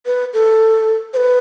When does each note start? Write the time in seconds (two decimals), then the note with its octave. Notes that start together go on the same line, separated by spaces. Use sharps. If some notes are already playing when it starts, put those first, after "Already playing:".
0.06 B4
0.33 A4
1.13 C5
1.17 B4